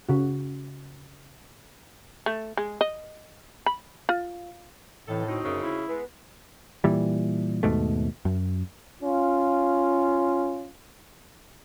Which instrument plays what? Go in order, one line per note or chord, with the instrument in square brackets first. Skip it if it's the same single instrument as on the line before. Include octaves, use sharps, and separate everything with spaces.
[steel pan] C#3 F#4
[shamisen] A3
G#3
D#5
B5
F4
[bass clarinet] A2 [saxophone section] C3 D#4 A4 [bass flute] E3
[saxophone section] D2 C4 D#4 [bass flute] F#4
[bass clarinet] F#2 [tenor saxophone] C#3
[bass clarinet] E4
[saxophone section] G#3 B3 [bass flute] B4
[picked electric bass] A#2 E3 G3
D#2 G#2 B2 A3
F#2
[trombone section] C#4 F4